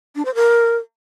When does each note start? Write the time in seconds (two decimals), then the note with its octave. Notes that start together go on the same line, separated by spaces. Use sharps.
0.16 D4
0.25 C5
0.35 A#4